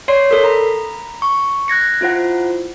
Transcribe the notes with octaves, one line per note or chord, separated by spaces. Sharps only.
C#5 D5 C6 C7
A4 A#4
A#5 B5
C#6
F#6 G#6 A#6 C#7
E4 F4 C5 F#5